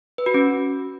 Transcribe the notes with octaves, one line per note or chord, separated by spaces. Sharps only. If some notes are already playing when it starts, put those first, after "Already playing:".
B4
F#4
C#4